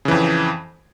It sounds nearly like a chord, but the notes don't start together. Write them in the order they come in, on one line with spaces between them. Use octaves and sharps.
C#3 E3 F2